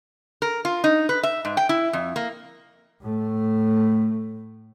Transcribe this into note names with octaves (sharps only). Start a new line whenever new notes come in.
A#4
F4
D#4
B4
E5
G#2
G5
E4
F2
A#3
A2 A3